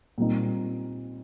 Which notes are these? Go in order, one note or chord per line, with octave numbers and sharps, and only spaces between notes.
A#2 G3 C4 D#4